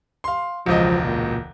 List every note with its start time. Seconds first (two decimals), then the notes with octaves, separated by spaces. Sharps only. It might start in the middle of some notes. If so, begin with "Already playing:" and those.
0.24 F5 C6
0.66 E1 C#2 F3 D#5
1.04 A#2